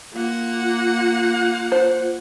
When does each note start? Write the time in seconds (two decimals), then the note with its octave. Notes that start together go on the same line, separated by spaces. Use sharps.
0.13 A#3 F4 F#5
1.72 C5